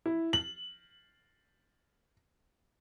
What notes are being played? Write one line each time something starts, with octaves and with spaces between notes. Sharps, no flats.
E4
F#7